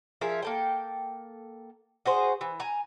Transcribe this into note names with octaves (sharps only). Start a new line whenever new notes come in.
F3 G#4 A#4 E5
A#3 A4 G5
F#4 G#4 C5
E3
G#5 A#5